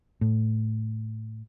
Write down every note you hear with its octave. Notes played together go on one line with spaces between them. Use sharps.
A2